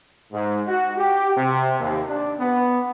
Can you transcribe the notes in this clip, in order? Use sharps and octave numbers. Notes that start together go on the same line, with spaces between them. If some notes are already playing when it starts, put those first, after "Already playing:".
G#2
F#4
G4
C3
D#2
D4
B3